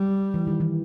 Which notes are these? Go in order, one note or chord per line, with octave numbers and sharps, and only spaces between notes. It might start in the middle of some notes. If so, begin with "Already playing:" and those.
Already playing: G3
E3
D#3
E3